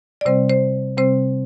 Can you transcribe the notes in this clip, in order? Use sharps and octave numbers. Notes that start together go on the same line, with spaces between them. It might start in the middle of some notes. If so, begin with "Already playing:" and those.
D5
C3 G3 C4 C5
C5
C3 G3 C4 C5